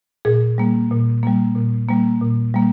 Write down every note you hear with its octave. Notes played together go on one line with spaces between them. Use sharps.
A#2 G#4
G3 A#3
A#2
G3 A#3
A#2
G3 A#3
A#2
G3 A#3